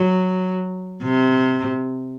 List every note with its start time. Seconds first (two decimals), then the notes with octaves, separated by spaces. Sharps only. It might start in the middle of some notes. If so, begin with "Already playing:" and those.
Already playing: F#3
1.04 C3